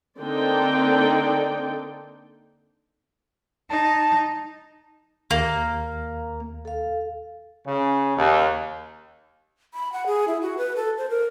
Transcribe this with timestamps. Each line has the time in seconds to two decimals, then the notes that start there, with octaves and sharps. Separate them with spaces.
0.18 D3 A#3 C4 D#4 D5 G5
3.70 D#4 A5
5.31 D#2 A#3
6.65 A4 F5
7.67 C#3
8.17 D#2
9.74 B5
9.93 F#5
10.06 G#4
10.28 E4
10.42 F#4
10.58 B4
10.76 A4
10.98 C5
11.10 A#4